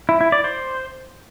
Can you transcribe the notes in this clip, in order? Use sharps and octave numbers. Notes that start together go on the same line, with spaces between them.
E4
E4
D5
C5